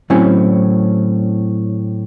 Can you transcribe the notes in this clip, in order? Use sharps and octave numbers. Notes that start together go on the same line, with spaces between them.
A2 F#3 C4 C#4 E4 G#5